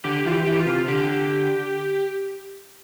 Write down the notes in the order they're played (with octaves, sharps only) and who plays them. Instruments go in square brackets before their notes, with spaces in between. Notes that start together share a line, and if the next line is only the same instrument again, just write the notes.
[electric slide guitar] D3 [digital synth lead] G4
[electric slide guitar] E3 [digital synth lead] F4
[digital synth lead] G4
[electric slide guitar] E3
[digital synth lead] G4
F4
[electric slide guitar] C3
[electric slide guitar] D3 [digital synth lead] G4